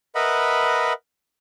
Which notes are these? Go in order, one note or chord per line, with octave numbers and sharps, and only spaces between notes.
A#4 B4 D#5 E5 F#5 B5